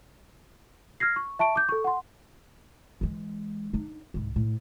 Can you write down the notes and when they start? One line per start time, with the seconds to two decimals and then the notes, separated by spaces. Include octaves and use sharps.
1.00 F6 G#6 A#6 C7
1.16 C#6
1.39 E5 A5 C#6 D7
1.56 D6 G6
1.69 A4 C#6
1.84 F#5 C6
3.01 E3 G#3
3.73 D4 D#4
4.14 C2 G#2
4.36 A2